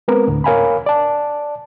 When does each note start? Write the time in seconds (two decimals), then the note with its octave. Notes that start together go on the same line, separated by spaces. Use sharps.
0.08 G#3 B3 C4 A#4 B4
0.27 D2 A2 D3
0.44 A#4 C#5 F5 G#5 A#5 B5
0.86 D5 A5